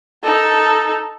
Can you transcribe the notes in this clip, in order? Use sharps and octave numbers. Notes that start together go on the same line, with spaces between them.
D#4 A4